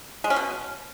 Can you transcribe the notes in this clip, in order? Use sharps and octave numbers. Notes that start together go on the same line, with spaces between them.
G#3
C#4
B2